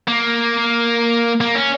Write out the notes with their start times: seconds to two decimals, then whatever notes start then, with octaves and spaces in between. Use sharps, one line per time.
0.08 A#3
1.41 A#3
1.55 C#4